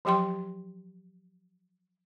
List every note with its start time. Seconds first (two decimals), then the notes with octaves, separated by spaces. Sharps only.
0.05 F3 F#3 G4 G5 C6